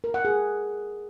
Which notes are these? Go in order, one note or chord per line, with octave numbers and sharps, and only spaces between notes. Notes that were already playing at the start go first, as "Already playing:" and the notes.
A#4
F#5
G#4